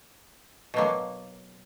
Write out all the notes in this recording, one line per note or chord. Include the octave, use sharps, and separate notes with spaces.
B2 F#3 A#3